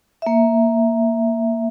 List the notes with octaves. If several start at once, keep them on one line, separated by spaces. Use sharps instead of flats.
A#3 E5